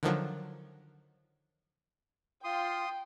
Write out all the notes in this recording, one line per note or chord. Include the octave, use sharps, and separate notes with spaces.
D3 D#3 F3 F#3
F4 G5 C6 D#6